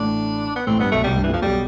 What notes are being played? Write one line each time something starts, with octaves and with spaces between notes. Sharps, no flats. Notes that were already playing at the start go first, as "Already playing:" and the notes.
Already playing: A1 A2 D4
B3
A1 A2 C4
G2 B3
B1 B2 A3
C2 C3 G3
G2
E3
F2
F3
B1 B2 G3